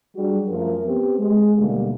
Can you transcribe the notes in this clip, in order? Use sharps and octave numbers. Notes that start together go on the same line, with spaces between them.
F#3 G3 D4 F#4 G#4
F#2 F3 A3 A#4
B3 C4 G4
G#3
D#2 B2 D3 G3 A3 A#3